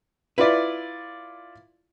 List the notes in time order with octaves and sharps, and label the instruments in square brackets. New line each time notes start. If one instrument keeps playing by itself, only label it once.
[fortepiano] E4 F4 D5 [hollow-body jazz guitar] B4